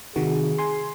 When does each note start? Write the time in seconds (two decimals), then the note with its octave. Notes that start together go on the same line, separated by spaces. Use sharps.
0.16 C3 D#3 F#4 G#4
0.58 G#5 C6